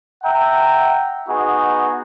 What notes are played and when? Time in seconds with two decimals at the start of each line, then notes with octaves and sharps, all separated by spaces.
0.23 E5 F#5 G5 A#5
1.28 B3 D#4 F#4 G#4